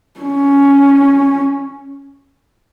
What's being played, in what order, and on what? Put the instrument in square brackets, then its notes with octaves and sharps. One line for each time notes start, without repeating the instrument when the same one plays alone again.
[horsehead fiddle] C#4